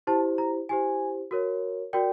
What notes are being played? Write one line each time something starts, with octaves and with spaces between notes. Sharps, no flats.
E4 G4 C5 A5
A#5
E4 G4 C5 G#5
F#4 A#4 C#5
F#4 A#4 D5 G5